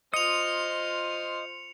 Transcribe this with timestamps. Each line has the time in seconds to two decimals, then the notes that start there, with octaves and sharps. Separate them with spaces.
0.14 F4 C5 D#5 D#6 C#7 F7